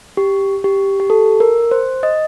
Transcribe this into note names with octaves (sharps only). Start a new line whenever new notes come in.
G4
G4
G4
A4
A#4
C5
D#5